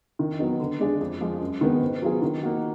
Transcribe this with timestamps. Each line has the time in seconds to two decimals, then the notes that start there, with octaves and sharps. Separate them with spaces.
0.19 D#3
0.39 F#3 B3 D#4
0.60 D3
0.80 G#3 D4 G#4
1.01 F2
1.21 F3 G#3
1.41 F#2
1.61 D#3 G#3 B3
1.82 G#2
2.02 F#3 B3 F4 G#4
2.22 D#3
2.42 A#3 D#4 F#4